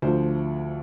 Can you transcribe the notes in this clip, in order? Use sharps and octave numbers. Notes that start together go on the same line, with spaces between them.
D2 D3 F3 C5